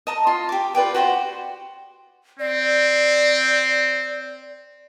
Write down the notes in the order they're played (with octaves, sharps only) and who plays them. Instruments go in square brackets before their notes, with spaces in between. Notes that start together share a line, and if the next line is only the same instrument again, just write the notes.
[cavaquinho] D#5 A5 A#5
F4
G4 D6
F4 B4 D5 G5
F#4 G4 C5 C6
[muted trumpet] C4 [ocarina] D5